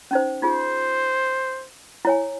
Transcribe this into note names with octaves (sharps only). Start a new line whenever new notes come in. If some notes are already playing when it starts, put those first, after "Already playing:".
C#4 D#4 C5
D#4 F4 G#4 C5
E4 C#5 G#5